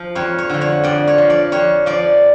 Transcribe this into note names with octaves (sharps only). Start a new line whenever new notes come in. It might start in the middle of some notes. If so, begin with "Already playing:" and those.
Already playing: F3
F2 C#5
C#5
D3 F3
C#5
F2 D5
C#5
F3
D5
F2 C#5
F3 D5